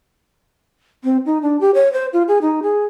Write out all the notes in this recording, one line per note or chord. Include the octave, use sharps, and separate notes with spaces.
C4
D#4
D4
G4
C#5
C5
F4
G#4
D#4
G#4